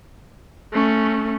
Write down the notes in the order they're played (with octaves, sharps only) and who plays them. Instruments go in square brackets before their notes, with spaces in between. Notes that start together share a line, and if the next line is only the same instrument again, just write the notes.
[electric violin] A3 C#4